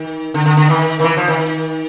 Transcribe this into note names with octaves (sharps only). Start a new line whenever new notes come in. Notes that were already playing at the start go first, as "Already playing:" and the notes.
Already playing: D#3
D3
D3
D3
D#3
D#3
E3
F3
D#3